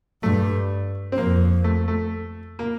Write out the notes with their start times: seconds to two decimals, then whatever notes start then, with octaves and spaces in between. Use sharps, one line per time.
0.23 G2 A3
1.12 C4
1.17 F2 A#3
1.64 A3
1.88 A3
2.59 A#3